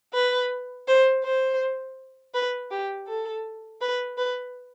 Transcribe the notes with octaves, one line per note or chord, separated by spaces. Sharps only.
B4
C5
C5
B4
G4
A4
B4
B4